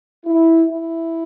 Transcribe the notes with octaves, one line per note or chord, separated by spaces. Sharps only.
E4
E4